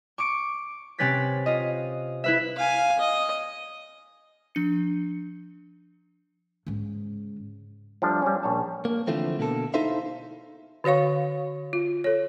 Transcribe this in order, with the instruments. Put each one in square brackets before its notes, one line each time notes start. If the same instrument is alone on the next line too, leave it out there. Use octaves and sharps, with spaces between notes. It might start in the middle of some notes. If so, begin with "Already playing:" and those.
[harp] C#6 D6 D7
C3 C4 C#4 B4 A6 B6
F4 D#5
E4 B4 E5
[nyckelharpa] F5 G#5
D#5
[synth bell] F3 D4 C#7
[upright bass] G#2 C#3
[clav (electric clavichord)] F3 G3 A3 D4
G3 C#4
A#1 C#5 A5
[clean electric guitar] A#3
D3 E3 F3 A3 C4
B2 D3 A#3 A4
D#4 E4 A4 C5 E5 F5
[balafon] D3 F#4 C#5 F5 C#6
F4
A4 C#5